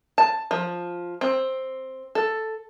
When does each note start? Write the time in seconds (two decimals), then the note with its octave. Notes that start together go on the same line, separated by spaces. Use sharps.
0.18 A5
0.51 F3
1.21 C4
2.15 A4